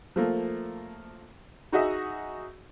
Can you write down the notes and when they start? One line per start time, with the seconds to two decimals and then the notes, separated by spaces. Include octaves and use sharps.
0.16 F3 A3 A#3
1.72 D#4 F#4 G#4 D#5 E5